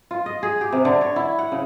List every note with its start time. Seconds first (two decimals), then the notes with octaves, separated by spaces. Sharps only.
0.11 F4
0.26 D#5
0.43 G#4
0.61 G4
0.73 C3
0.85 D3
1.01 C#5
1.16 E4
1.39 F#5
1.52 C#3